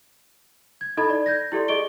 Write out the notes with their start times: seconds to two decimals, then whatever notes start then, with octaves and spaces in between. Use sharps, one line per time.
0.81 G#6
0.97 D#4 E4 A4 D#5 B5 G#6
1.10 D5
1.26 G6 G#6 A#6
1.52 E4 G4 A4 D5 C6
1.68 G#4 D#5 C#6 D7 G7